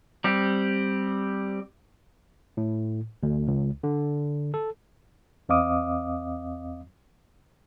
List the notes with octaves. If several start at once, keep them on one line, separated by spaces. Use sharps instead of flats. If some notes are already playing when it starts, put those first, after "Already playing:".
G3 C4 G4
A2
D2
C#2
D3
A4
E2 C4 D#5 F5 D6 D#6